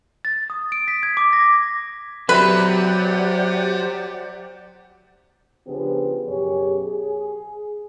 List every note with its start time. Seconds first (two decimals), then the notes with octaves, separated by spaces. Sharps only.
0.25 A6
0.50 D#6
0.72 D7
0.88 B6
1.03 G#6
1.17 D6
1.33 A#6
2.29 F#3 G4 B4 C5 D5 E5 F#5
5.67 C#3 F3 B3 D4 G4 G#4
6.28 F#2 B2 G4 G#4 C#5
6.87 G#4